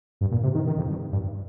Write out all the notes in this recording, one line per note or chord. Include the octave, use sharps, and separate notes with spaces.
G2
A#2
C3
D#3
D#3
F2
G2
G2